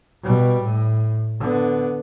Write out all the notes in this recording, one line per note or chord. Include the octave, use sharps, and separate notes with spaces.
B2 G3
A2
D3 B3